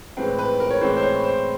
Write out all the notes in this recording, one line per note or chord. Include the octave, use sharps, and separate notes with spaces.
A2 E3 G#3 C4 B4
B4
A#4
C#5
A2 E3 G#3 C4 C5
C5
C#5
C5